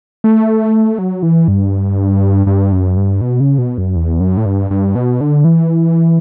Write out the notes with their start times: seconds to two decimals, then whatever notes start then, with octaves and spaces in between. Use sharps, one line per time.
0.24 A3
0.99 F#3
1.23 E3
1.48 G2
2.47 G2
2.72 F#2
2.97 G2
3.21 B2
3.40 C#3
3.58 B2
3.78 F#2
3.96 E2
4.20 F#2
4.37 A2
4.46 G2
4.71 G2
4.95 B2
5.21 D3
5.44 E3